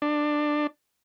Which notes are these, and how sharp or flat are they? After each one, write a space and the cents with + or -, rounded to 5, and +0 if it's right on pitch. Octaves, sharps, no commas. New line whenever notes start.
D4 +15